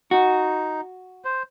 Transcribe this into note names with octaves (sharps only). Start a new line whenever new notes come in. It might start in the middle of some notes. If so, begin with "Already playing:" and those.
D#4 F#4
C5